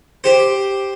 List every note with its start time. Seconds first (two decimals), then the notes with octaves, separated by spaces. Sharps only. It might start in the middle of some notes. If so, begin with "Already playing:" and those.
0.24 G4 C5